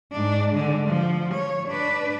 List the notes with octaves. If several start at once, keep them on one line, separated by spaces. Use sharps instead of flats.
G#2 D4
D3 G#3
F3
C#5
D4 B4